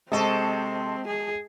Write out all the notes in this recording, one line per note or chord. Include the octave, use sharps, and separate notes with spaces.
C3 G#3 C4 A4 D#5 A5 C#6
G#4